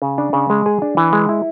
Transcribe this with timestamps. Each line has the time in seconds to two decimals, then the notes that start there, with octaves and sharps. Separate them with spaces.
0.02 C#3
0.18 D4
0.33 C#3
0.50 G#3
0.66 G#4
0.82 D4
0.97 E3
1.13 G#3
1.29 E4